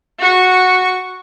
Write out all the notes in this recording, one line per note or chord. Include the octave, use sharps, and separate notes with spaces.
F#4 C#6